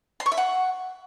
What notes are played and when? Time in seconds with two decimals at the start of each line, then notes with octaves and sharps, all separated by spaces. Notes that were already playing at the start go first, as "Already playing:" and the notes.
0.20 C6
0.26 C#6
0.32 E5
0.37 F#5